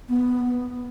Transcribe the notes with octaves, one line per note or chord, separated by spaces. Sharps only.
B3